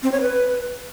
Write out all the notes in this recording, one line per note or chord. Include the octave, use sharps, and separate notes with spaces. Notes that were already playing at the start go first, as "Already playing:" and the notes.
C4
C#5
B4